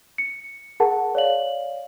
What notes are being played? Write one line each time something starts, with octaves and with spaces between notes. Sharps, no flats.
C#7
G#4 A#4 F#5 A5
C#5 D5 F5 F#7